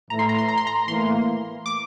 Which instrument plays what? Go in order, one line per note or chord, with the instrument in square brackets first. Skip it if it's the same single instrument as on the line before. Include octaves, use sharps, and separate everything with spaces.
[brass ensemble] A2 E3 A3 E4 [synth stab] A#5
[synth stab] C6
A#5
C6
A#5
C6
A#5
[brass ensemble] A2 E3 A#3 [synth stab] C6
[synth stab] D6